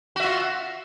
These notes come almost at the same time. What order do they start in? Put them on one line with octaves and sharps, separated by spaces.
F#4 E5 F4